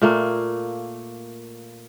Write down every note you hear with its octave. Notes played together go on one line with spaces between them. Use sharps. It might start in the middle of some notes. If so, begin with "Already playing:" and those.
A#2 A3 A#3